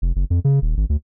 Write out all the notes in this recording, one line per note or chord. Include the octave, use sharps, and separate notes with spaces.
F1
F#1
F2
C#3
D#1
G#1
D2